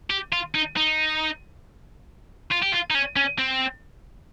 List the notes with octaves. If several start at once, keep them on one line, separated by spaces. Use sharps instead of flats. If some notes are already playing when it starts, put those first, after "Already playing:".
G4
F4
D#4
D#4
F4
G4
F4
D#4
C#4
C#4
C4